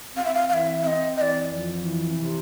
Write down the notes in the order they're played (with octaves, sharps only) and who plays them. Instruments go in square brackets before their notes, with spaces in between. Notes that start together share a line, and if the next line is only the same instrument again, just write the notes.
[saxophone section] C4 [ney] F5
[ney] E5
F5
[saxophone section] E3 [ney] F5
[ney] E5
[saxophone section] C4 [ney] D#5 E5
[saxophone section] E3 [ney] D5 D#5
[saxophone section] F2
E3
C3